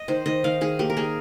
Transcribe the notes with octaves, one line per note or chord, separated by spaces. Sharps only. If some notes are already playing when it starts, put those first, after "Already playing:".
Already playing: D#5
D#3 C5
D#3 D#5
D#3 F5
D#3 G#4
A#3 G4
A#4
A#3 G#4